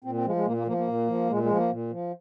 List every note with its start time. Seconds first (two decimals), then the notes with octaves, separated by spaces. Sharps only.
0.04 A#2 C4
0.15 C4
0.25 F3 G#3
0.36 G#3
0.46 A#2 A#3
0.57 A#3
0.67 F3 A#3
0.77 A#3
0.87 A#2
1.07 F3
1.29 A#2 G#3
1.43 G#3
1.50 F3
1.56 A#3
1.71 A#2
1.91 F3